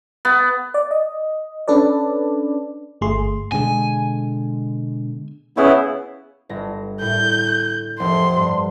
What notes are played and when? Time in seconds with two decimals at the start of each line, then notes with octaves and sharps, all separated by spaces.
0.25 B3
0.74 D5
0.91 D#5
1.68 C#4 D4 A4 B4 D5
3.01 G1 A3 G#4 C6
3.52 B2 D3 G#3 G#5
5.57 C#3 B3 E4 G#4 C#5
6.49 G1 A#6
7.01 A2 G6
8.00 F1 C6
8.36 G2